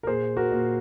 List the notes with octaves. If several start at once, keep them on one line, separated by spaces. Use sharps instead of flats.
A#4
A#2 G#4 C5
F#4 A#4
A#2